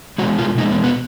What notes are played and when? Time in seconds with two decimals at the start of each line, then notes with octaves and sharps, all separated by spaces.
0.18 B2 G#3 F#4
0.38 F4
0.58 B2 G#3 D#4
0.71 B3
0.84 B3